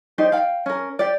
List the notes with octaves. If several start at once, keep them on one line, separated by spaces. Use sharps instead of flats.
D#4 G4 C5 D5
F5 G5
C#4 A#4
G4 D5